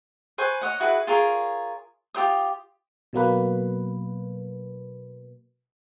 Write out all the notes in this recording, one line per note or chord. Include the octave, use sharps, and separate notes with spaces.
B4 C5 G#5 C#6
C#5 D#5 F#5
E4 F#4 G#4 B4
F4 G#4 A#4 C#5
F4 G4 C5 D#6
B2 F#3 A#3 B4